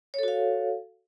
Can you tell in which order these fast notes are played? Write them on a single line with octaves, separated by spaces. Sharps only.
C#5 A4 F#4 F5